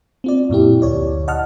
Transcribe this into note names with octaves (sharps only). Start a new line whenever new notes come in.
C4 F4 D5
F#2 A#2 E4 G4
D2 C#5 D5
D#5 F#5 A5 F6